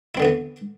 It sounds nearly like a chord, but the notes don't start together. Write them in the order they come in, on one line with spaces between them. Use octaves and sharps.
E4 C4 D3 B3 E3